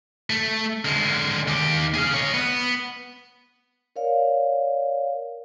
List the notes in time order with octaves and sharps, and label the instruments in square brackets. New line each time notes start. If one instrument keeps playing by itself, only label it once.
[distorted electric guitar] A3
D3 G#3
D#2 G4
G#4 F5
C#5 D#5
B3
[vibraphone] A#4 C#5 D5 F5